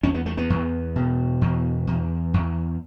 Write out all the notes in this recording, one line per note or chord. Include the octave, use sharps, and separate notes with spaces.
E2 C#4
B3
A3
B3
E2
B2
E2
E2
E2